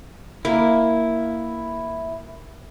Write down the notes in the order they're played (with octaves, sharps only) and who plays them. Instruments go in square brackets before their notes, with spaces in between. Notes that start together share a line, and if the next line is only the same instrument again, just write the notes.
[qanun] A#3 [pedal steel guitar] E4